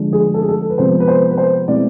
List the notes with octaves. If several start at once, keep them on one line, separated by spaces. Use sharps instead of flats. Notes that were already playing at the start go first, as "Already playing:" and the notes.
Already playing: D3 F3 G#3 D4
G#4
A4
G#4
A4
B4
C3 F3 G#3 B3 C5
B4
C5
B4
C5
B2 G#3 C4 E4 D5